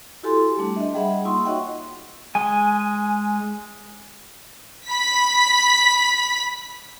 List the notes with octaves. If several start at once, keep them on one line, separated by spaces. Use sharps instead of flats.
E4 F#4 G4 A4 G#5 C6
G3 A3 D4
D#5 E5
G3 G#4 E5 F#5 B5
A#3 D#4 F4 C6 C#6 E6
F#4 C#5 D#5 E5 F#5 G5
G#3 G#5
B5 B6